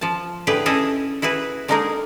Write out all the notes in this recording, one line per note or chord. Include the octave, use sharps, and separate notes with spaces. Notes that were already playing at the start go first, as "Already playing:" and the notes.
F3 A5
A2 D3 G4 G#4 B4
C#4 E4 G#4 A4 D#5 G#5
E4 F#4 G#4 B4
D3 G#3 A#3 D#4 G#4 A#4